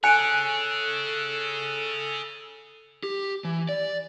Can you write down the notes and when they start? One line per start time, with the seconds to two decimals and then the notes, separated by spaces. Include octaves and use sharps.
0.04 G#4 A4 C#5 G#5 F#6 C#7 D7
3.03 G4
3.44 E3
3.69 D5